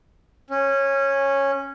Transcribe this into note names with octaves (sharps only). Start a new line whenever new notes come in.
C#4